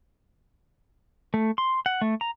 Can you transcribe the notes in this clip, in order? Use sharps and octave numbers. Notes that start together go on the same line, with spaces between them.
A3
C6
F#5
A3
A#5